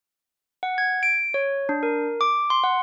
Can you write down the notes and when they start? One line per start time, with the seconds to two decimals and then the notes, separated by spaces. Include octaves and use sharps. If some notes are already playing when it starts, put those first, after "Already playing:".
0.63 F#5
0.78 G#6
1.03 D7
1.34 C#5
1.69 D4
1.83 A#4
2.21 D6
2.50 C6
2.64 F#5